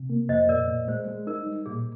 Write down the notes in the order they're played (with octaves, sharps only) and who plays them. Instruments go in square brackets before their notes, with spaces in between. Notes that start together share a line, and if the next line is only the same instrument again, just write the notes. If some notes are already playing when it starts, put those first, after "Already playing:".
Already playing: [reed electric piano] C3
A#3
[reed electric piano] F2 [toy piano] C5 D#5
[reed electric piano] A#2 [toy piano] A#4 D5
[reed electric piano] A#2
[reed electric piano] G#3 [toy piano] C5
[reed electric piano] G#3
[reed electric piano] D#4 [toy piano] A#4
[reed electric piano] G3
[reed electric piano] A#2 [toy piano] G#4